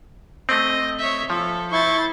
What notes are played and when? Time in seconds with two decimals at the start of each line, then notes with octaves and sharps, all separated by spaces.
0.49 A3 C4 D#5
0.99 C#5 E5
1.30 F3 A4
1.72 E4 C5 C#6 A6